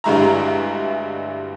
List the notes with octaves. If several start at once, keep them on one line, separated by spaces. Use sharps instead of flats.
D2 G2 G3 G#3 E4 A#5